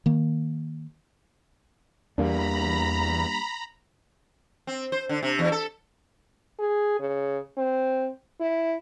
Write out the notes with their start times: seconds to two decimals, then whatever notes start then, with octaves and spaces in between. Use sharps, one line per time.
0.06 D#3 A#3
2.18 E2 G3 A#3 D4 A#5 B5
4.67 C4
4.92 C5
5.09 D3
5.23 C3
5.39 E2
5.52 A4
6.59 G#4
7.00 C#3
7.57 C4
8.41 E4